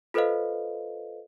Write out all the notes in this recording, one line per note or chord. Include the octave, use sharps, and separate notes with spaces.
F4 A4 B4 C5 D#5 F5